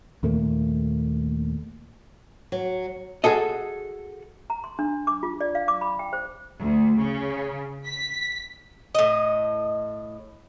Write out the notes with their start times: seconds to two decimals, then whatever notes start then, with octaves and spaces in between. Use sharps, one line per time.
0.23 D#2 A#2 A3 A#3
2.52 F#3
3.24 F#4 G#4 A4 D#5
4.50 A#5
4.64 C6
4.79 D4
5.07 D6
5.23 F4
5.41 D5
5.55 F5
5.68 D6
5.81 B5
5.99 G5
6.13 C5
6.60 D2
6.99 C#3
7.86 B6
8.95 A2 D#5